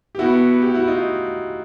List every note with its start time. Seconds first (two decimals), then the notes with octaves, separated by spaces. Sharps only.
0.15 G4
0.19 B3 E4 F#4
0.62 G4
0.74 E4 F#4
0.88 D#4 F4